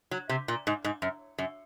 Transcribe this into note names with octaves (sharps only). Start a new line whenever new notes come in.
F#3
C3
A#2
G#2
G#2
F#2
F#2